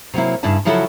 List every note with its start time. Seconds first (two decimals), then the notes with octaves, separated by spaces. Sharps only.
0.14 C3 F#3 A#3 E4
0.43 G2 C#3 D4 E4 A5
0.65 C#3 F3 F#3 E4 F#4 A4